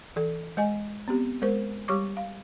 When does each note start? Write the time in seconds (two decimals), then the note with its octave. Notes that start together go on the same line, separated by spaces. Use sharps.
0.16 E3 A4
0.57 G#3 D#5 G#5
1.08 B3 C4 G4
1.42 G#3 A#4 C5
1.88 G3 G4 C#5 C#6 D6
2.17 F5